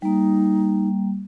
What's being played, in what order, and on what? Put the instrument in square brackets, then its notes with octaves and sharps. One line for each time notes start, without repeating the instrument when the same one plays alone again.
[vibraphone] G3 A#3 [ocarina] D#4